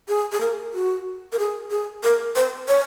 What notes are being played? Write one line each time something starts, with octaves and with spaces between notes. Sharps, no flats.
G#4
G#4
A#4
F#4
A#4
G#4
G#4
A#4
C5
C#5